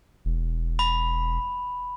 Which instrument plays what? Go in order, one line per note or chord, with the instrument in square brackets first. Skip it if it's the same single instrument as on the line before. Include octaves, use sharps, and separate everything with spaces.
[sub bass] E1
[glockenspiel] B5